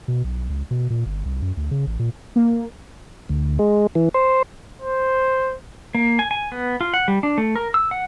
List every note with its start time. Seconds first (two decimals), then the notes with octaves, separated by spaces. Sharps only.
0.08 B2
0.24 B1
0.50 C#2
0.71 B2
0.90 A#2
1.06 G1
1.25 C2
1.42 F#2
1.57 D2
1.71 C#3
1.87 A1
1.99 A#2
2.36 A#3
3.29 D2
3.59 G#3
3.95 E3
4.14 C5
4.82 C5
5.95 A#3
6.19 G#5
6.31 G#5
6.52 B3
6.81 F4
6.94 F#5
7.08 G3
7.23 D4
7.38 A3
7.56 A#4
7.74 E6
7.91 F#5